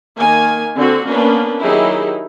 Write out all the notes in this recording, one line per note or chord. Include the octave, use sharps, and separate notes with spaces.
D#3 A#3 G#5
D3 C4 F#4
A#3 B3 C#4 D4 B4
D#3 F#3 D#4 E4 G4 G#4